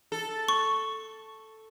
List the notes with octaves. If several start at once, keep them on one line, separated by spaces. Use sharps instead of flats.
A4
C#6